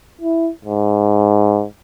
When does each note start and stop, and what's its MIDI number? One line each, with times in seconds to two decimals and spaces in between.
0.21 0.50 64
0.65 1.64 44